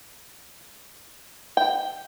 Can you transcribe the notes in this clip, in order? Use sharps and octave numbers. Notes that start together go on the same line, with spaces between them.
G5